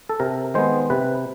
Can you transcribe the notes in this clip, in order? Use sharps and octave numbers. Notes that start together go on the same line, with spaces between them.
A4
C3 A#4
D#3 G#3 B3 C5
C3 B4